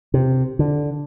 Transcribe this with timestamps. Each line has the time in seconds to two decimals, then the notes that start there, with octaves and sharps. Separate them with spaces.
0.14 C3
0.59 D3